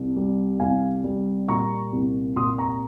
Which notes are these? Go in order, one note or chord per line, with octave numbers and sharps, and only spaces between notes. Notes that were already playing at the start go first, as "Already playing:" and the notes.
Already playing: C2
G3
C2 F5 G#5
G3
A#2 A#5 C#6
C2
A#2 C6 D#6
A#5 C#6